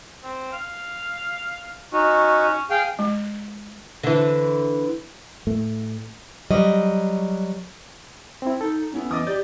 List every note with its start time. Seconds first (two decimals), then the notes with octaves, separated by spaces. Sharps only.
0.23 C4
0.52 F5
1.93 C#4 D#4 F#4
2.70 G#4 F5 G5
2.99 G#3
4.03 D3 E3
5.47 A2 A3
6.51 F#3 G3 D#5
8.42 C4 E4
8.61 D#4 A4
8.94 B3 C#4 E4
9.11 E3 D#5 D6 D#6 A6
9.27 G4 D5 G6 A6